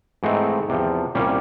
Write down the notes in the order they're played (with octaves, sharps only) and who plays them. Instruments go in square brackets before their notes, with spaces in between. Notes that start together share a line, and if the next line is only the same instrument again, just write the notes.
[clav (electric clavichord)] G#2 E3 A3 C4 D#4
E2 C3 F3
C2 A#2 G3 A#3 C#4